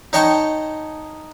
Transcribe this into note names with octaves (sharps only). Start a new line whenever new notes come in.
D#4 C#5 D#5 G5 A5 C#6